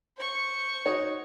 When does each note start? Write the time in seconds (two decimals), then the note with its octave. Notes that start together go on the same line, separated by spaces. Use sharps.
0.17 C5 C#6
0.86 D#4 F#4 C#5